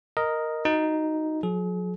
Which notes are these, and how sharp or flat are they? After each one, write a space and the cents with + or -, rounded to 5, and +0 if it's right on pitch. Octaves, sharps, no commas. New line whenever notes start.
A#4 +0 D#5 +0
D#4 +0 F#4 +0
F#3 -45 G#4 +40